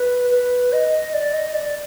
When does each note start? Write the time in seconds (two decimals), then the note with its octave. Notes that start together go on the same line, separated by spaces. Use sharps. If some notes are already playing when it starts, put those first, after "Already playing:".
Already playing: B4
0.30 B4
0.73 D#5
1.14 D5
1.33 D#5
1.54 D5